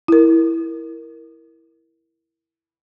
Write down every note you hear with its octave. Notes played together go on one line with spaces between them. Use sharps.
E4 A#4